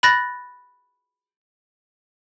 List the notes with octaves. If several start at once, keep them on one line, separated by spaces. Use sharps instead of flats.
B5 F#6 A6 A#6